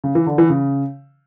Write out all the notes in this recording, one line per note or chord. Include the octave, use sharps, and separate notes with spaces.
C#3
E3
D3
E3
C#3